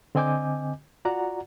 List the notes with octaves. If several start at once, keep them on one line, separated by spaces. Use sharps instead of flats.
D3 C4 D#5 G#5 D6 G6
F4 F#4 D5 F#5 A#5